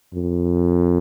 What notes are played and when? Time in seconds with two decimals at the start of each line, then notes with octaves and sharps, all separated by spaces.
0.14 F2